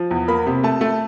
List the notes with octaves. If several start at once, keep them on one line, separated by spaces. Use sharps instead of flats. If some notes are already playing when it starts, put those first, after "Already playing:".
Already playing: F3
E2
A#3 B5
C3
A3 A5
A3